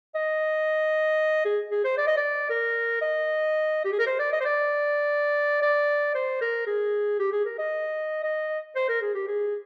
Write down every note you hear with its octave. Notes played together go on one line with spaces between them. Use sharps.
D#5
G#4
G#4
C5
D5
D#5
D5
A#4
D#5
G4
G#4
A#4
C5
D5
D#5
C5
D5
D5
C5
A#4
G#4
G4
G#4
A#4
D#5
D#5
C5
A#4
G#4
G4
G#4